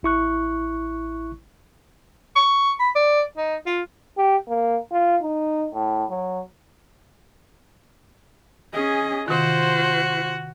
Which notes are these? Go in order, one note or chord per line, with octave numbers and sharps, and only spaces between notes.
A1 E4 C#6 F#6
C#6
B5
D5
D#4
F4
G4
A#3
F4
D#4
A2
F#3
C#4 G#4 D#5
C3 D#3 F4 F#4 C5